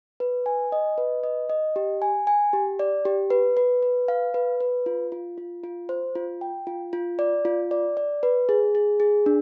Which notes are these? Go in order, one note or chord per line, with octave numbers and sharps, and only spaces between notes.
B4
G#5
D#5
B4
D#5
D#5
G4
G#5
G#5
G4
D5
G4
B4
B4
B4
F5
B4
B4
F4
F4
F4
F4
C5
F4
G5
F4
F4
D5
F4
D5
D5
B4
G#4
G#4
G#4
D4